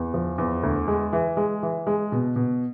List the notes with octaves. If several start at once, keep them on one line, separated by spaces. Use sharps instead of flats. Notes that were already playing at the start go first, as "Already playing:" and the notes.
Already playing: E2
F3
E2
D2
G#3
E3
G#3
E3
G#3
B2
B2